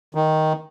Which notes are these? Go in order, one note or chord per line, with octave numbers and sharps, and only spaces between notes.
D#3